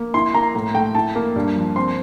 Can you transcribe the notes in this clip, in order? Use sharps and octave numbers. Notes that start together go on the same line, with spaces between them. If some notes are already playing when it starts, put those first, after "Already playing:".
Already playing: A#3
E4 C6
A#3 A#5
A2
A3 G5
E4 A5
A#3
G2
F3
C4 C6